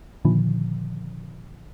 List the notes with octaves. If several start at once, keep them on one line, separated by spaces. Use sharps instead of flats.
A#2 D3 D#3 F3